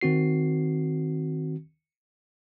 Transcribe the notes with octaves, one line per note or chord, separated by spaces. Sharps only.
D#3 C4 F#4 C7